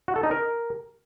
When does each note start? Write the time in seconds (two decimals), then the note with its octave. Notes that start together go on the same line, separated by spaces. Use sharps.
0.08 F#4
0.16 A4
0.23 D#4
0.31 A#4